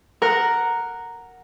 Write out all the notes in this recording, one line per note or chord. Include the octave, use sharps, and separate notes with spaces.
A#4 F#5